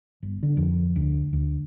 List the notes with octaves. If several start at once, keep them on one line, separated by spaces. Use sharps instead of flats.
G1
D3
F2
D2
D2